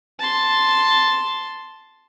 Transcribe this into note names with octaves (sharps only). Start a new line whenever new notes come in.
A5 C6